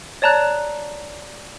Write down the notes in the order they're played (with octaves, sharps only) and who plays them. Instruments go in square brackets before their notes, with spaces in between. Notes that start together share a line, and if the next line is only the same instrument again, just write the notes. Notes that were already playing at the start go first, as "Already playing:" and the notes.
[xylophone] C#5 D5 A5 A#5 F#6